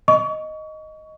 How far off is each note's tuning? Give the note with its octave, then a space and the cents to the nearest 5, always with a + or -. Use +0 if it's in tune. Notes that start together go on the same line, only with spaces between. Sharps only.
D#5 +0 C#6 +30